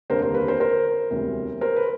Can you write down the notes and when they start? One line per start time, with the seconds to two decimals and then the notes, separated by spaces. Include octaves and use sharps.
0.10 F1 D#2 D3 G3 A#3 A#4 C5
0.22 A#4 C5
0.34 B4
0.48 A#4 C5
0.60 A#4 C5
1.10 E1 D2 C3 E3 G3
1.61 A#4 C5
1.76 B4